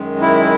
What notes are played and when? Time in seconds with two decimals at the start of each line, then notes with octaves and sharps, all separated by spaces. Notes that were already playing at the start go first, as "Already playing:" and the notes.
Already playing: F#2 D#3 G#3
0.22 E4